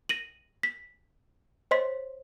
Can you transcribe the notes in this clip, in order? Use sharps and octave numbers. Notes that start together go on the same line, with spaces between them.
A#6 D#7 F#7
B6
C5 C#5 D#5 C6 B6